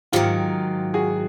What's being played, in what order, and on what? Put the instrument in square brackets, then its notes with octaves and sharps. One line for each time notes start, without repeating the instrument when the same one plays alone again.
[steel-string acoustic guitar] G#2 D#3 F#3 [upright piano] F4 G4
[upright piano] F#4 G#4